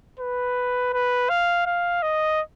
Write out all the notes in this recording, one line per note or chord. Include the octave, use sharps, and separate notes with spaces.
B4
B4
F5
F5
D#5